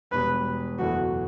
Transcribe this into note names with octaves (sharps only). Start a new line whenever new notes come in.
E1 E2 B2 G3 B4
F#1 E2 B2 A3 E4 F#4